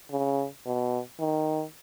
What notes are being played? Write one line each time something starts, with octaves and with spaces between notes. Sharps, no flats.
C#3
B2
D#3